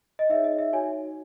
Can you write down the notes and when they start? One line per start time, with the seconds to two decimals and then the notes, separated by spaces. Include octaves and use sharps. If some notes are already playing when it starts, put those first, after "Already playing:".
0.19 D#5
0.29 D#4 G#4 C#5 E5
0.44 D#5
0.59 E5
0.72 D#4 F#4 C#5 G#5